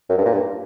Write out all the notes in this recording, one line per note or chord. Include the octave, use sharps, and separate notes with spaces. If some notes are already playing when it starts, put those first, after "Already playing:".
F#2
G2
A#2
G2